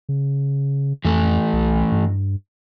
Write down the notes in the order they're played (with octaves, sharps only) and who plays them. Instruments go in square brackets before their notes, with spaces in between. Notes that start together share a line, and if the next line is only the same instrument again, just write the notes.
[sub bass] C#3
[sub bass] F2 [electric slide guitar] E3 A3
[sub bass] B1
G2